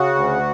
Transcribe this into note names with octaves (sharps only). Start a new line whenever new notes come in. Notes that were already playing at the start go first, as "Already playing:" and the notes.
Already playing: C#3 F#4
D2